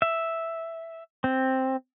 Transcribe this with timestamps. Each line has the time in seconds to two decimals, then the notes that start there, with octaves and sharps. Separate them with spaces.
0.02 E5
1.24 C4